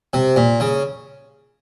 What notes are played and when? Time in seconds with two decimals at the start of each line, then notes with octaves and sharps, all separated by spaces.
0.13 C3
0.36 A#2
0.60 C#3